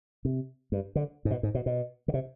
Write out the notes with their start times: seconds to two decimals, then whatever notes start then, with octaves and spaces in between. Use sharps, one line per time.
0.25 C3
0.72 G2
0.95 D3
1.25 G#2
1.31 B2
1.43 G#2
1.55 B2
1.66 B2
2.08 D3
2.14 C3